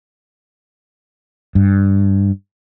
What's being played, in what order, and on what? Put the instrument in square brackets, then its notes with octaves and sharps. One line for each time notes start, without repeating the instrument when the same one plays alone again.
[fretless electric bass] G2